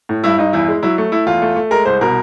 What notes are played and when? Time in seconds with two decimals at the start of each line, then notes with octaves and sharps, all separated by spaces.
0.09 A2
0.24 G2 E4
0.38 G2 D#4
0.53 E2 E4
0.68 G#3
0.83 F#3 E4
0.98 A3
1.12 A3 E4
1.27 E2 F4
1.42 A3
1.56 A3
1.71 G#3 A#4
1.85 C2 C5
2.01 B2 A#4